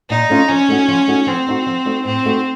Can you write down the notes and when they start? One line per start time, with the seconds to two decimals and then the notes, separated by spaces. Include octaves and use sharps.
0.10 A#2 D#4
0.29 A3 C#4 F4
0.49 F3 C#4
0.68 A3 D#4 F#4
0.88 F3
1.08 A3 D#4 F#4
1.27 F3 C4
1.47 A3 D#4 F#4
1.66 F3
1.85 A3 D#4 F#4
2.05 A2 C4
2.25 A3 D#4 F#4